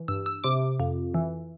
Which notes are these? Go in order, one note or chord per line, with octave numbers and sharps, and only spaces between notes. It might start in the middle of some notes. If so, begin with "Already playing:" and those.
Already playing: E3
G2 E6
E6
C3 D6
F2
E3